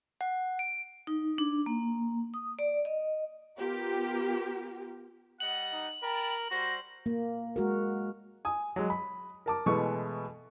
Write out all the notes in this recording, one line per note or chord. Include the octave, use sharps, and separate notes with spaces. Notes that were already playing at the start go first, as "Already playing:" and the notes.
F#5
D7
D#4
D4
A#3
D#6
D5
D#5
B3 F4 G4 A#4
G3 D#5 F#5 F#7
D#4
A#4 D5 G5 A5 B5
G3 F#4 C5 A#6
A#3
G#3 F#4 A#4
G#5 D#6
F#3 G#3
B5
A#4 A5 D6
B2 E3 G#3 A3 B3 C#6